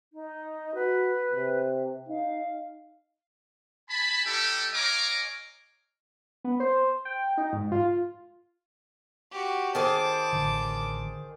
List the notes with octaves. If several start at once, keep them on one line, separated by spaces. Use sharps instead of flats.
D#4
F#4 B4
C3
D#4 F5
G#5 A5 B5
G3 D#4 E4 G4 A4
C#5 D#5 F5 G#5 A#5 D6
B3
C5
G5
D#4
G#2
F4
F#4 G4
D#3 G#4 C5 A5 D6
A1 D3